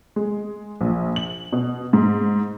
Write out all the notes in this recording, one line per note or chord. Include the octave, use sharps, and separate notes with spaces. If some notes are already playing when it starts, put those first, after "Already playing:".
G#3
A#1
F#7
B2
G#2